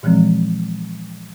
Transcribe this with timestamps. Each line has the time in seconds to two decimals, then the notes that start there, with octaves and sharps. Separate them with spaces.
0.03 A#2 E3 F3 G#3 C4